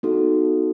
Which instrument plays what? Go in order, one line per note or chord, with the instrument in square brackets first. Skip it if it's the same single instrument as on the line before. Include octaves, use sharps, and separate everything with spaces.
[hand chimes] B3 D#4 F#4 A4